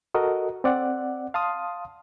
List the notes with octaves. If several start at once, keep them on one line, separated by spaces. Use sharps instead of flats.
F#4 A4 A#4 D#5
C4 D5 F#5
F5 A5 C6 D#6